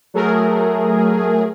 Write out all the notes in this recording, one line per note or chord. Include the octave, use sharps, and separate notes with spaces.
F#3 A3 G#4 A#4